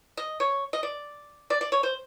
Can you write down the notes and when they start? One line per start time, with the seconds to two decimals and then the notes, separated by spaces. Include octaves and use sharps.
0.17 D#5
0.40 C#5
0.73 D#5
0.83 D5
1.50 D5
1.61 D5
1.72 C#5
1.83 C5